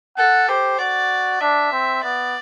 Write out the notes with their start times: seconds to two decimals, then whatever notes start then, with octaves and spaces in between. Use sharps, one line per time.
0.17 A4 F#5
0.48 G4 C5
0.79 F#4 D5
1.41 D4 E5
1.72 C4
2.03 B3 D5